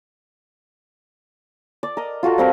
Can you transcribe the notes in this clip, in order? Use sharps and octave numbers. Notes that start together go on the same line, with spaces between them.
D5
A#4 D#5
F4 F#4 A4 A#4
G3 C4 A#4